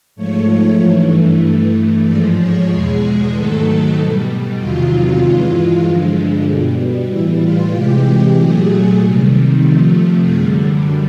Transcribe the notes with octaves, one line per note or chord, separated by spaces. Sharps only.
G#2 F3 A3 C#5
G2 E3 A3
G2 E3 A3
G#2 F3 G#3 D5
C#5
E2 B2 G#3 G#4
G#2 D#3 F#3 A3 A4
B2 G3
E2 C3 D#3 F#3 F4
G2 E3 G#3
G2 D3 F3 G#3
B2 G3
A2 E3 G3 E4
F4
C3 E3 G#3 G4
A#2 F#3 A3 G#4
C3 D#3 G3
C3 F3 A3
F#2 D3 G3 G#4